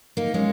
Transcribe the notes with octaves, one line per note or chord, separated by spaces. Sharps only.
A#3 D#4
G#3 C#4